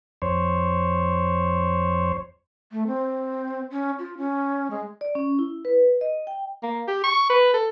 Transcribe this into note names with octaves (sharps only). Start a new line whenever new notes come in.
F2 C5 C#5
A3
C4
C#4
F4
C#4
G#3
D5
C#4
E4
B4
D#5
G5
A#3
G4
C#6
B4
A4